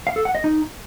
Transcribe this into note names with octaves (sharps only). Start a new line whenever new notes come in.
F5
A4
F#5
D#5
D#4